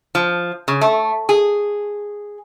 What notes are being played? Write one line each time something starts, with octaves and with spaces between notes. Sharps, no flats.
F3
C#3
A3
G#4